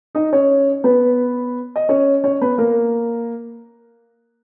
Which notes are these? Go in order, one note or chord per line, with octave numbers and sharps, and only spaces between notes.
D#4 D#5
C#4 C#5
B3 B4
D#5
C#4 C#5
C#4 C#5
B3 B4
A#3 A#4